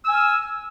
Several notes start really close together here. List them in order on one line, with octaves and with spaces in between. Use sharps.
E6 G#5 F6